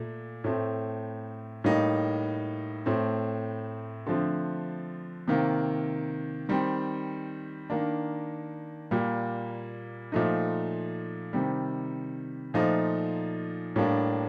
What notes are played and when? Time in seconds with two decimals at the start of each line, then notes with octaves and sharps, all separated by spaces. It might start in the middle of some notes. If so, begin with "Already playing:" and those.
Already playing: A#2 A3
0.44 A2 A3 C4
1.64 A2 G3 A#3 D#4
2.86 A2 A3 C4
4.06 D3 F3 A3 C4
5.28 C3 D#3 A#3
6.49 D#3 G3 C4
7.70 D#3 A#3 D4
8.91 A#2 G3 A#3
10.12 A#2 F3 A3 D#4
11.33 C3 D#3 G3
12.54 A#2 F3 A3 D#4
13.76 A2 G3 A#3 D4